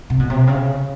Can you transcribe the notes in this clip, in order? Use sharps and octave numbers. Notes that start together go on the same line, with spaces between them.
C3
B2
C3
C#3